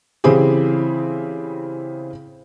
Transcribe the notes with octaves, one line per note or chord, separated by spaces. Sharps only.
C#3 E3 C4 E4 G4 G#4